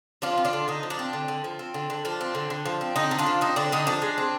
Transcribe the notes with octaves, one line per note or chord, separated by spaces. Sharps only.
F3 D4 F4
C4
D4 F4
D3
D3 D#4
F3
D4
C4
D3
D3
F3
C4
D3
D3
F3 D4
C4
D3
D3
F3
C4
D3 D#4
D3
D4 F4
F3
C4 D#4
D3 D4
D3 D#4
F3 D4
G#3
C4